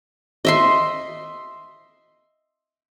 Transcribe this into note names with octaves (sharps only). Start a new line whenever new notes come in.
D#5 E5 C6